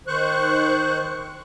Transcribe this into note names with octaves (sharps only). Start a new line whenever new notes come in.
D#3 C5 C#6 F#6